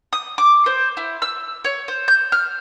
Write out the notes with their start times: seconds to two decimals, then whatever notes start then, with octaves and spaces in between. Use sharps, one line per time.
0.13 D#6
0.38 D6
0.66 C5
0.97 E4
1.22 E6
1.65 C#5
1.88 C5
2.08 G6
2.32 F6